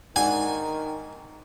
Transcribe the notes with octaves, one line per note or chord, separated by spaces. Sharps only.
G#2 D#3 D4 F#5 G#5